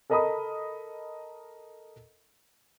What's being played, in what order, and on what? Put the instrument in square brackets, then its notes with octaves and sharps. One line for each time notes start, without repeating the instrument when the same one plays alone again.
[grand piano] A4 A#4 D#5 A#5 B5 D#6